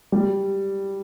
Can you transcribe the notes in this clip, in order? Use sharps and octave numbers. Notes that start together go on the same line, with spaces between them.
G3